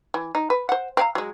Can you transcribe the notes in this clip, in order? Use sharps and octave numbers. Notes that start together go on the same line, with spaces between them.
E3
D#4
B4
C5 F#5
C4 F5 A#5
F#3 G#3